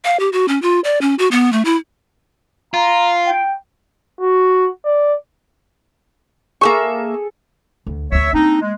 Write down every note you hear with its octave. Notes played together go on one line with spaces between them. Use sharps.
F5
G4
F#4
C#4
F4
D5
C#4
F#4
B3
A3
E4
F4 A#5
G5
F#4
D5
A#3 G#4 A4 E5 C#6
D2
D2 C#4 C#5 E5
A#3 C4 D4 D#4
G#3